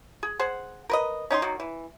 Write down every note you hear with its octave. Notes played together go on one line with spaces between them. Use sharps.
G#4
G#4 C5 F#5
A#4 B4 D#5
C#4 D#4 G#5 C6
D#3 F#3 A#3
E3